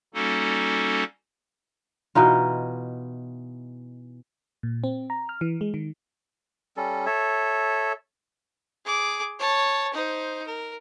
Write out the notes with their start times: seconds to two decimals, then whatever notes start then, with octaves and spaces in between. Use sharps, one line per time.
0.14 G3 A#3 C#4 D#4 F#4 A4
2.15 B2 E3 D#4 F4
4.63 A#2
4.84 C4
5.10 A#5
5.29 F6
5.41 E3
5.61 G#3
5.74 D#3
6.77 G3 C#4 A4
7.06 A4 C#5 E5
8.86 G#4 D6
9.39 C#5 A5
9.94 D#4 C5
10.47 A#4